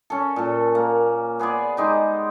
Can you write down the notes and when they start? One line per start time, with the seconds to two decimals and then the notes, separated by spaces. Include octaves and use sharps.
0.10 C#4 A4
0.36 A#2 A4
0.75 A#3
1.39 B3 G#4 C5 D5
1.77 G#3 D#4 G4